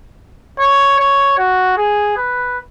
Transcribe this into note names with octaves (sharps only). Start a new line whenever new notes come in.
C#5
C#5
F#4
G#4
B4